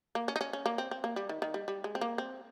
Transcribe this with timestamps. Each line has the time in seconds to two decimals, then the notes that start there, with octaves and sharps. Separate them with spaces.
0.15 A#3
0.28 C#4
0.36 D#4
0.41 C#4
0.53 C#4
0.66 A#3
0.78 C4
0.91 C4
1.04 A#3
1.16 G3
1.29 D#3
1.42 D#3
1.54 G3
1.68 G3
1.84 G#3
1.95 C4
2.01 A#3
2.18 C4